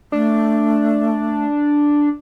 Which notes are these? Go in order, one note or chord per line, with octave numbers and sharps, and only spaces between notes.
A3 D4